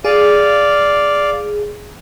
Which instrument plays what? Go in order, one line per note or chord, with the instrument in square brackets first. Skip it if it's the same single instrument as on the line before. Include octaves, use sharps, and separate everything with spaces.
[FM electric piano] G#4 [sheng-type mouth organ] D5 F5